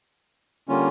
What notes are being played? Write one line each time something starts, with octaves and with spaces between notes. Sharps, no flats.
D3 G3 A#3 C#4 F4